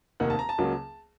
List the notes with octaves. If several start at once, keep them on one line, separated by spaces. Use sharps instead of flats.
F1 D#2 D#3 A#3 F#5
A5
A#5
A5
C#2 C#3 F#3 A#3